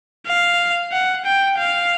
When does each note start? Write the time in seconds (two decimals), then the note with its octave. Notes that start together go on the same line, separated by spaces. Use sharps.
0.28 F5
0.92 F#5
1.25 G5
1.58 F5